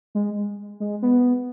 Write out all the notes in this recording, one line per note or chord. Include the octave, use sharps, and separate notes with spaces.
G#3
G#3
B3